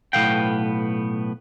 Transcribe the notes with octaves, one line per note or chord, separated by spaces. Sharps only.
B1 A2 D#3 B3 F5 G5